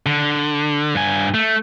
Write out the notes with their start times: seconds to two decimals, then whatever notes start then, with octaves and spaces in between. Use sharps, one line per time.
0.06 D3
0.94 G2 G#5
1.34 A3